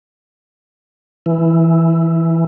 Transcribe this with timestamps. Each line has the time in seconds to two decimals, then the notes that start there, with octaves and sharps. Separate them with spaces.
1.26 E3